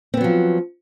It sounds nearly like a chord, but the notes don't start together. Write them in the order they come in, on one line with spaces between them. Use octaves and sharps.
C4 B3 F#3 F3